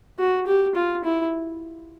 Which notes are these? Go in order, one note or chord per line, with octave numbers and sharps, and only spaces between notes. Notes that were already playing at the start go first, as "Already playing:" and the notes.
F#4
G4
F4
E4